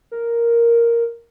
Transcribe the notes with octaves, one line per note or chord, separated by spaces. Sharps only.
A#4